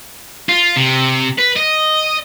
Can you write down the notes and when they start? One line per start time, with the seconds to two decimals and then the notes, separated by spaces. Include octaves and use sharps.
0.49 F4
0.76 C3
1.38 B4
1.56 D#5